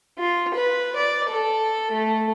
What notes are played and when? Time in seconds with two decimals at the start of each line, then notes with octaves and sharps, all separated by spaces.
0.18 F4
0.55 B4
0.96 D5
1.29 A4
1.92 A3